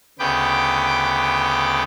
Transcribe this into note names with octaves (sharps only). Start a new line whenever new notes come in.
D2 C#3 B3 B4 G5 D6